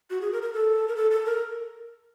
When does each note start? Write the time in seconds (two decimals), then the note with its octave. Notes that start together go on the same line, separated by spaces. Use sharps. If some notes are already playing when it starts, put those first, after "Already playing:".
0.10 F#4
0.21 G#4
0.32 A#4
0.42 A#4
0.54 A4
0.88 A#4
0.96 A4
1.11 A4
1.26 A#4